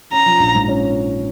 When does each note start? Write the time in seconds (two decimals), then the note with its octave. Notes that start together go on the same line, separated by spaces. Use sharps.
0.12 C#4 A#5
0.26 F3
0.40 A#1
0.54 G#2
0.68 C#4